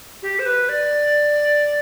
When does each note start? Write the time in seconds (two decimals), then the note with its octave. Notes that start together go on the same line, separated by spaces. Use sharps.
0.23 G4
0.39 C5
0.46 B4
0.69 D5